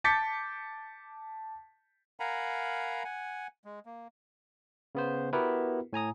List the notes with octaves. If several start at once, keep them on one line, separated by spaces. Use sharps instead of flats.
A5 D6 G6 A6 B6 C#7
A#4 F5 F#5 G#5 A#5 B5
F#5 G#5
G#3
A#3
C#3 B3 C5
B3 E4 F#4 G4 A#4 B4
A2 G#5 A#5 D#6